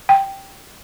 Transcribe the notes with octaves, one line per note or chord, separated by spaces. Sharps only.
G5